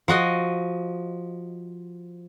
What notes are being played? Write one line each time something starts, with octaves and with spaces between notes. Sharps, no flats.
F3 F#4 D#5